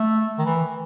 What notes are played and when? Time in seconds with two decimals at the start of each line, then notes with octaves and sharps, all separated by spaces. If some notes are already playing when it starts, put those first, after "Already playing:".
Already playing: A3
0.38 D#3
0.46 E3